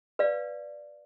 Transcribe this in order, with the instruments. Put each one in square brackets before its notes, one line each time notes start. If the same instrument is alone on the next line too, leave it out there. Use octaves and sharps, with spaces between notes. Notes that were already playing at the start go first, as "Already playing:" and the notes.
[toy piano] B4 D5 F5